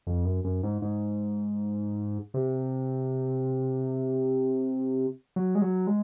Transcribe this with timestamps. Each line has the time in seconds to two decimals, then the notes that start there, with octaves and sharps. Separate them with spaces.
0.07 F2
0.25 F#2
0.44 F#2
0.63 G#2
0.82 G#2
2.34 C3
5.36 F#3
5.55 G#3
5.62 F#3
5.87 G#3